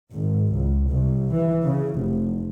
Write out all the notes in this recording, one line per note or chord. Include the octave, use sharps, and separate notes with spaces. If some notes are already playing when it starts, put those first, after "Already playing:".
G#1
C#2
C2
E3
C#3
F1